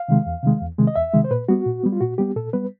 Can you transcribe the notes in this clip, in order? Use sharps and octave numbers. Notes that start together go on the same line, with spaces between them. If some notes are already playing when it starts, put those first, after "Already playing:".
Already playing: F5
C3 D#3 G#3
E2
C3 D#3 G#3
E2
C3 D#3 G#3
D#5
E2 E5
C3 D#3 G#3
C5
A#2 B4
G3 B3 F#4
A#2
G3 B3
F4
A#2 F#4
G3 B3 G4
A#2 A4
G3 B3 B4